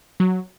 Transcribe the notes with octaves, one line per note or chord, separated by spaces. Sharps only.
F#3